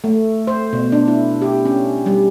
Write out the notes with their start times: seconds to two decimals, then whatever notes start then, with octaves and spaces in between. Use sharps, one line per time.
0.04 A3
0.47 C5
0.73 B2
0.92 D4
1.08 E4
1.42 G4
1.65 C#4
2.06 G3